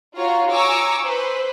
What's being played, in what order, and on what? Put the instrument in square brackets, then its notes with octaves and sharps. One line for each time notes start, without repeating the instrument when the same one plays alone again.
[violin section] F4 F#4 C#5 A#5
G#5 A#5 C#6 D6 E6
B4 C5